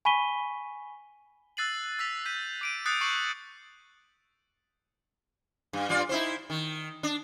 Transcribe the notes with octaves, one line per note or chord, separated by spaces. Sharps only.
G#5 B5 C#6 B6 D#7 G7
E6 F#6 A6 C7 D#7 F#7
E6 A6 B6 F7
G6 B6 D#7
D6 D7 D#7
D#6 F#6 G6 A6 C7 C#7
C#6 G6 C7 C#7 D#7 F#7
G2
G2 F4 D5
D#4 E4 C5
D#3
D4